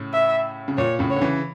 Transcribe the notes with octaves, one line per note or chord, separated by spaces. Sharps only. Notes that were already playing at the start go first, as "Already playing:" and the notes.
Already playing: A2 C#3
E5
C#3
A#2 C#5
A2 C#3
C#5
D3
C#3 E3